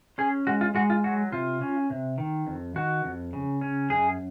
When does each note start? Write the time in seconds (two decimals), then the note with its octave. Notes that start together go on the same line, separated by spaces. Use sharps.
0.18 C#4 G#4
0.47 G#3 F#4
0.61 F4
0.75 G#3 F#4
0.90 F4
1.04 F#3 F#4
1.32 C3 F4
1.61 C#4
1.90 C3
2.18 D#3
2.47 F2
2.76 D#3 F#4
3.05 F2
3.33 C#3
3.61 C#4
3.90 F#2 G#4